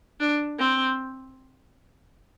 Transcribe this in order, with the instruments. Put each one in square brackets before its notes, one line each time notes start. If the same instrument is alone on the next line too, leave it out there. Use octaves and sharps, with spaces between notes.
[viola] D4
C4